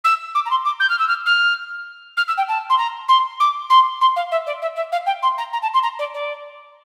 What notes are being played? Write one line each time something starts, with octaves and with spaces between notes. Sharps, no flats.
E6
D6
A#5
C6
D6
G6
F6
E6
F6
F6
F6
E6
G5
A5
C6
A#5
C6
D6
C6
C6
F5
E5
D5
E5
E5
F5
G5
C6
A#5
A#5
A5
C6
A#5
D5
D5